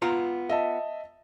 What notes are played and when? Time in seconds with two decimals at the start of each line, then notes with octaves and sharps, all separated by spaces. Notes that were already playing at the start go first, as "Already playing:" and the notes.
0.02 B3 F4 A#5
0.49 D#5 E5 A5